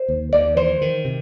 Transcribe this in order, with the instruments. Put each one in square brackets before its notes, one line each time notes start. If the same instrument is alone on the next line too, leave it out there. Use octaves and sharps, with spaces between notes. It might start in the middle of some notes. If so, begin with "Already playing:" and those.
Already playing: [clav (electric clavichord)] C5
[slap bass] D#2
[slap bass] D#2 [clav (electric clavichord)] D5
[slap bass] E3 [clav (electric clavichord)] C5
[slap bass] D#3
C3